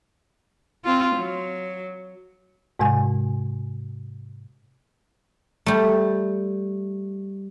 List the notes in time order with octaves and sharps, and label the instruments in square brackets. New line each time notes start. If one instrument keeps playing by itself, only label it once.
[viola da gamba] C4 F4
F#3
[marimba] G#2 C3 G#3 G#5
[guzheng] G3 A3